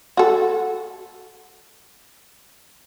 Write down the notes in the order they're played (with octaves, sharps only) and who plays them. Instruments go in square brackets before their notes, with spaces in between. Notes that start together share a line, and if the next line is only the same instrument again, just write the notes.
[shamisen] F#4 A4